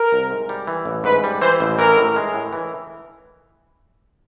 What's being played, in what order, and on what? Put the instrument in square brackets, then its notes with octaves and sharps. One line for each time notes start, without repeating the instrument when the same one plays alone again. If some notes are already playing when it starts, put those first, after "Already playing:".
Already playing: [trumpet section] A#4
[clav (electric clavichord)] C2
G#2
G3
E3
A1
[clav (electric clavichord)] G#2 [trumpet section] B4
[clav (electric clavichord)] G3
[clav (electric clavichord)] E3 [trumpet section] C5
[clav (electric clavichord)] A1
[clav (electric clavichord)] E3 [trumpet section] A#4
[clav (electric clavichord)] A2
G#3
A2
E3